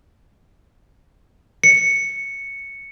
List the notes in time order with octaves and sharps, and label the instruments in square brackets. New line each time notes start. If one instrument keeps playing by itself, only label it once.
[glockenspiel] C#7